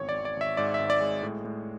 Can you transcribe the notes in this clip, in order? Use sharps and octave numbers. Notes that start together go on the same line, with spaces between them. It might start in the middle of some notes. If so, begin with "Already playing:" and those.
Already playing: G#1 E2 C#5
D5
G#1
D5
G#1 E5
G#2 D5
E5
G#1
D5
G#3
A2
A2